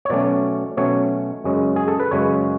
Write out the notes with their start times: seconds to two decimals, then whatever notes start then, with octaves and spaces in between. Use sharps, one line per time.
0.05 C#5
0.10 B2 F#3 A3 C#4 D5
0.77 B2 F#3 A3 C#4 C#5
1.44 F#2 C#3 G#3 C#4
1.76 G#4
1.88 A4
2.00 B4
2.11 F#2 C#3 G#3 C#4 C#5